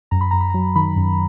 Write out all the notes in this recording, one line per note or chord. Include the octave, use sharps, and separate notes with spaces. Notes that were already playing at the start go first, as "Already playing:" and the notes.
F#2 A#5
B5
F#2 A#5
B5
F#3 A#5
D#3 B5
F#2